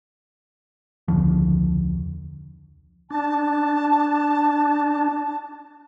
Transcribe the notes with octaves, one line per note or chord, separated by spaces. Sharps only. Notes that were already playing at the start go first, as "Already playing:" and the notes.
E1 C#2 D3 F3
D4 A5